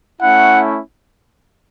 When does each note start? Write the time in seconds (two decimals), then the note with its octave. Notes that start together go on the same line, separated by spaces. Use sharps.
0.21 A3 C#4 E4 F#5